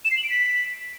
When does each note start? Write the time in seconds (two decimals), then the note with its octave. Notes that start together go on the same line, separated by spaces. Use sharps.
0.05 E7
0.11 C7
0.17 F#7
0.24 D7
0.30 B6